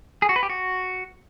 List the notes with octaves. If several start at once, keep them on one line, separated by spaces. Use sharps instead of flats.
G#4
F#4
B4
G4
F#4